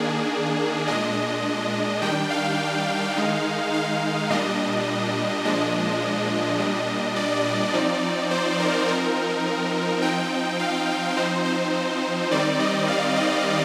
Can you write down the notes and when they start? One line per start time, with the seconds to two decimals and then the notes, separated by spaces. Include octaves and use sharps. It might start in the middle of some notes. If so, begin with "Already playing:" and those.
Already playing: D#3 A#3 D4 G#4
0.87 A#2 G#3 D4 D#5
2.02 D#3 G3 D4 G5
2.30 F5
3.16 D#3 G#3 D#4
3.73 F5
4.30 A#2 G3 D4 D#5
5.45 A#2 F3 G#3 D4 D#5
6.59 A#2 G3 D4
7.16 D5
7.74 F3 C4 D#4
8.31 C5
8.59 A#4
8.88 F3 C4 D#4 A#4
10.02 F3 C4 D#4 G5
10.59 F5
11.17 F3 C4 D#4 C5
11.45 C5
12.31 D#3 G3 C4 D#4 D5
12.60 D#5
12.88 F5
13.16 D#5